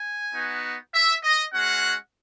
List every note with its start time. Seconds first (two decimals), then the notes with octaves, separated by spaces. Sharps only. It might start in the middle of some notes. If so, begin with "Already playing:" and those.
Already playing: G#5
0.33 B3 D#4 F#4
0.93 E5
1.22 D#5
1.52 G#3 C#4 F#4 F#5